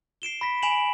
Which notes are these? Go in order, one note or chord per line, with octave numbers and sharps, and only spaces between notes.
C7 D7 E7 G7
B5 A#6 B6
G#5 B5 D7 E7 F#7